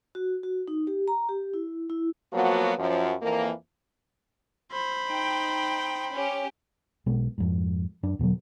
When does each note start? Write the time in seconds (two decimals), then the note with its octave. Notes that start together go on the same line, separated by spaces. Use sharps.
0.15 F#4
0.43 F#4
0.68 D#4
0.87 G4
1.08 A#5
1.29 G4
1.54 E4
1.90 E4
2.33 F3 F#3 A#3 B3 F#4
2.79 F#2 F3
3.22 F2 E3 A#3
4.72 C5 B5
5.07 D#4 G5
6.11 C#4 G4
7.06 B1 B2 G#3 B3
7.38 F2 G#2
8.03 F#2 D4
8.19 E2 B2 D3 F#3